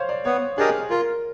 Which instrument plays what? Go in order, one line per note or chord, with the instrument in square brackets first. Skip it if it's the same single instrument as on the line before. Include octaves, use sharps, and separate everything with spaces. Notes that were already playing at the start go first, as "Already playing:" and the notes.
Already playing: [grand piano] C5 C#5 F5
D5
[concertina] B3 [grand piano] C#5
[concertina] D4 G4 A#4 D#5 [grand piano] G#4
[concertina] F4 [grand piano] A#4